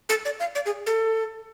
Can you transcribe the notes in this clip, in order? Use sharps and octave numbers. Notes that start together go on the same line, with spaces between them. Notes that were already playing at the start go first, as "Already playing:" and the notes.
A4
D5
F5
D5
G#4
A4